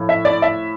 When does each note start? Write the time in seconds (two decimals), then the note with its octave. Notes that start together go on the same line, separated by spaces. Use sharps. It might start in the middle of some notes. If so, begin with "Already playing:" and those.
Already playing: A2 F3
0.09 E5
0.25 D5
0.42 E5